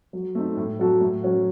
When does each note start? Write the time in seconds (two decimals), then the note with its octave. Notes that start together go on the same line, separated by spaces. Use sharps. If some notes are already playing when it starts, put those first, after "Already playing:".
0.13 F#3
0.35 A3 C4 D#4
0.57 A2
0.79 F#3 C4 F#4 A4
1.01 A2
1.23 F#3 C#4 F#4